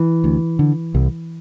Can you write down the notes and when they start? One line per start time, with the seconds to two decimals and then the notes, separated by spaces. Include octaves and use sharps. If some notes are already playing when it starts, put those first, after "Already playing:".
Already playing: E3
0.24 D2
0.59 D3
0.94 C2